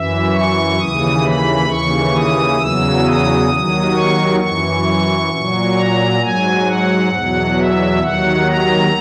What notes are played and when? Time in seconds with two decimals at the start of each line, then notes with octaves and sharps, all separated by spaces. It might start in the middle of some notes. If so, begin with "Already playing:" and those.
Already playing: F#2 E3 E5
0.34 C#6
0.79 D#2 C#3 E3 D#6
1.25 B5
1.69 D#2 C#3 E3 C#6
2.15 D#6
2.59 E2 C#3 F#3 E6
3.05 D#6
3.49 D#2 D#3 F#3
3.95 C#6
4.40 F#2 E3 C#6
5.30 A#2 F#3
5.75 A#5
6.20 G#2 F#3 G#5
6.65 F#5
7.11 E2 B2 F#3
7.56 E5
8.00 D#2 D#3 F#3 F#5
8.46 A#5